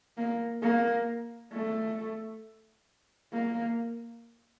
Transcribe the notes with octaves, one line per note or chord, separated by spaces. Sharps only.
A#3
A#3
A3
A#3